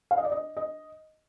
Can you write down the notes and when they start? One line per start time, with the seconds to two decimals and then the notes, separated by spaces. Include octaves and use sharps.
0.11 F5
0.18 D#5
0.25 D5
0.32 D#5
0.57 D#5